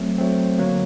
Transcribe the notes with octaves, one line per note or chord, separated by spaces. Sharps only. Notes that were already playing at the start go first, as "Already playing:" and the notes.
Already playing: F#3 A3 C4
F#3 A3 C4
D3 F#3 A#3